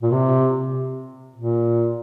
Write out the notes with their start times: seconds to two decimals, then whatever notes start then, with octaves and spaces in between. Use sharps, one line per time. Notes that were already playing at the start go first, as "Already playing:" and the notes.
0.02 A#2
0.11 C3
1.36 A#2